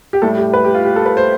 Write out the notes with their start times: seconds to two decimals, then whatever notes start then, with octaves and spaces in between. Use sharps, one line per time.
0.13 G4
0.22 A2 G3 A4
0.38 G4
0.53 B4
0.64 G4
0.74 F4
0.85 G4
0.96 A4
1.06 B4
1.17 C5